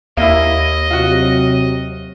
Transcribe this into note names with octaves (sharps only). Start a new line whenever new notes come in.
D#2 A#3 E4 D#5
C3 F#3 F4 F#4